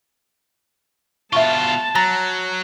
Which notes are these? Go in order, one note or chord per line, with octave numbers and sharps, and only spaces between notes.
B2 F4 E5 A5 C#6
F#3 A#5 A6 A#6